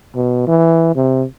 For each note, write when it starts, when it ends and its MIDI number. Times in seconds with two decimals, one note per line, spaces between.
0.15 0.43 47
0.47 0.90 52
0.95 1.24 48